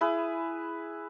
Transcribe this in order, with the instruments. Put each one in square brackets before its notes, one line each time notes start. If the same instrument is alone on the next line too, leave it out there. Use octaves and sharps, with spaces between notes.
[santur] E4 G#4 B4